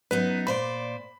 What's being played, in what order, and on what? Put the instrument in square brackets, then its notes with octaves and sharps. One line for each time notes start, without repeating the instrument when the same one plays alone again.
[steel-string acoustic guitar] F#2 B3 D#4 [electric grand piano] B4
[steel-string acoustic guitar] A#2 C5 D5 [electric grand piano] B5